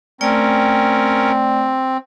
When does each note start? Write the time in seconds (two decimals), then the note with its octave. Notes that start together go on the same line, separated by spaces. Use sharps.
0.21 A3 C4 C#4 A#4 D5 G5